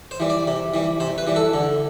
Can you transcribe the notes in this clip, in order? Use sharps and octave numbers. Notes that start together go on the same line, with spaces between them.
C5
E3 G3
D5
C3
E3 G3
C3 C5
B4
E3 G3
A4
D3